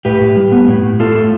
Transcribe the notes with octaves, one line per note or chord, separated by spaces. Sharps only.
A2 G4 B4
A2
G3
B3
A2
A2
A2 F4 A4
A2